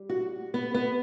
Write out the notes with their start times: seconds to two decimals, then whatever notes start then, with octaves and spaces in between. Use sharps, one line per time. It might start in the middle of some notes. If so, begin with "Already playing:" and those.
Already playing: G3
0.10 F#4
0.54 B3
0.74 B3